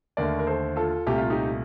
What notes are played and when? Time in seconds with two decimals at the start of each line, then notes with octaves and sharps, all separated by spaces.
0.17 D#2 D3 A3 A#4 D5
0.39 A#4
0.47 A4 C5
0.76 F4 A4
1.06 C2 A#2 A3 G4
1.18 F4
1.30 D#4 G4